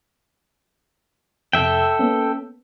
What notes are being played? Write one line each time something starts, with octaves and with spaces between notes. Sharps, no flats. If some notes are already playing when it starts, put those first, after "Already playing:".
F2 C3 A4 E5 G5
A#3 B3 C#4